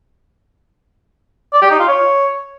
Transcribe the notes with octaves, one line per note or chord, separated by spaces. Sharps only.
D5
G4
D#4
F4
C#5